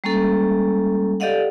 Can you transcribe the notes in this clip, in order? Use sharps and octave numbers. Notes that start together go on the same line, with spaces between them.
G3 G#3 A#3 C#4 A4
G4 A4 D5 D#5 F5 F#5